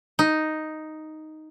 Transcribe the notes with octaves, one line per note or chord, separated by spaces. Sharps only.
D#4